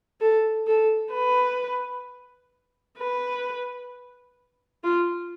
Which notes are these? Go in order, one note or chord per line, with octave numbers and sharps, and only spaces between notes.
A4
A4
B4
B4
F4